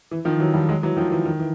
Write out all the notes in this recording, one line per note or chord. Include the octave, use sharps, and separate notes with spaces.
E3
D#3 F3
E3 F#3
F3 G3
F#3 G#3
E3 F#3
D#3 F3
E3
D#3
E3